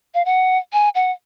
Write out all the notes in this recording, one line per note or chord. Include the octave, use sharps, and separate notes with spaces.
F5
F#5
G#5
F#5